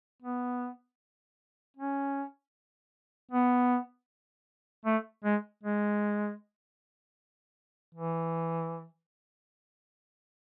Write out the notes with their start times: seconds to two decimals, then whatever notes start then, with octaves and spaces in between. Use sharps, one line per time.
0.22 B3
1.77 C#4
3.31 B3
4.86 A3
5.24 G#3
5.63 G#3
7.95 E3